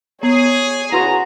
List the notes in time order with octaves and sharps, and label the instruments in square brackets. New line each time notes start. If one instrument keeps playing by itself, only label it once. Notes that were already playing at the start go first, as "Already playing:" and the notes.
[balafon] B3 [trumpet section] G#4 [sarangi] C#5
[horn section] C#3 A#5 [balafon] E4 B4 C6 [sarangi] F#4